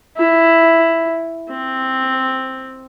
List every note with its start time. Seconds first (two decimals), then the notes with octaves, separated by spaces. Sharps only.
0.17 E4
1.50 C4